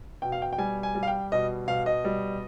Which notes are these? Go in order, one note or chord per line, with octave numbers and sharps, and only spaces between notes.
B2 G5
F5
G5
G5
G3 G#5
G#5
G3
F5
G5
B2 D#5
B2 F5
D#5
G3